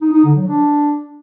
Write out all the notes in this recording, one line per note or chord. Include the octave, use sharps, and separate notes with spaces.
D#4
D#4
D3
F#3
D4